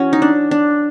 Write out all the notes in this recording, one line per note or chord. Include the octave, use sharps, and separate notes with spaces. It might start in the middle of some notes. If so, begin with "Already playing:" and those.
Already playing: E3 C#4 F#4
D#4
D4
D4